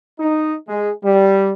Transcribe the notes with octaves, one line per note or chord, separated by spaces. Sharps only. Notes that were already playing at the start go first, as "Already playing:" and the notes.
D#4
G#3
G3